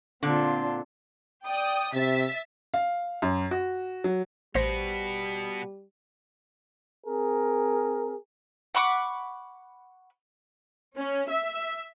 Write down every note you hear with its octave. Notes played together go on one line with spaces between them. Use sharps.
A#2 D3 C4 D4 F4
D5 G5 D#6
C3 E5 A6 B6
F5
F#2
F#4
F#3
A1 B2 G3 B3 C5 A#6
C4 G#4 A#4
F#5 B5 C#6 D6
C#4
E5